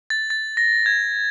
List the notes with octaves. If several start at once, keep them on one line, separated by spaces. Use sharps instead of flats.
A6
A6
A#6
G#6